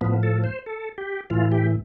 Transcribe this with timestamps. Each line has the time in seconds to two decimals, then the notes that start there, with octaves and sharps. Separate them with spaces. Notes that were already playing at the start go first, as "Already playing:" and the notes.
0.01 A2 F3 B3
0.23 A4
0.44 C5
0.66 A4
0.98 G4
1.30 A2 E3 F4
1.52 G4